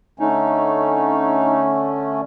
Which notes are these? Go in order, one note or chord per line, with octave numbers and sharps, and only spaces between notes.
D3 A3 C#4 D#4